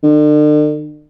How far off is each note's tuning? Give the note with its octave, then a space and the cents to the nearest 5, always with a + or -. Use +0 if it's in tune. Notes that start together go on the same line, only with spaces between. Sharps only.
D3 +40